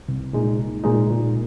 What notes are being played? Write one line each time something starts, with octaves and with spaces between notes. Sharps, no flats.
C2
A#2 G#3 D#4
C2
A#2 G#3 D#4
A#2